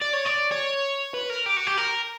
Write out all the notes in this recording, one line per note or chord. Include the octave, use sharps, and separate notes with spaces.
D5
C#5
D5
C#5
B4
A#4
G4
F#4
G4
A#4